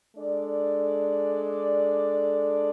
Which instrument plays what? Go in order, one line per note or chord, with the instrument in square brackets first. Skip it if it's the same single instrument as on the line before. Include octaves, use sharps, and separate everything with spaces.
[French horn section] G#3 D4 A4 D5